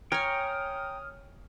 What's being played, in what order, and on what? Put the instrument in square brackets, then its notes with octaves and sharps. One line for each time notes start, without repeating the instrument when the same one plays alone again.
[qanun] C#5 G#5 [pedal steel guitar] G5 A#5 [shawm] D#6 [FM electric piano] F6